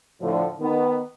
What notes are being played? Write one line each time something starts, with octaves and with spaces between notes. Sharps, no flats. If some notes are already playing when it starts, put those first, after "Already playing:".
A2 D3 F3
D#3 B3